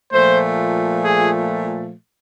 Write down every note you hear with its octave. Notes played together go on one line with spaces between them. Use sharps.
A#2 F3 A3 C5
G#4